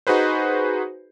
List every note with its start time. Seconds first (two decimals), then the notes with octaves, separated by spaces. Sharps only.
0.07 D#4 F#4 G#4 B4 C5